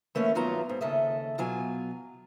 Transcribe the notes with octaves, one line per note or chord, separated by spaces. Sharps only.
E3 A3 A#3 C#4
G2 D#3 F#3 B3 F4 A#5
G#2
D#2 C#3 A4 D#5 E5
B2 F#3 F4 G#5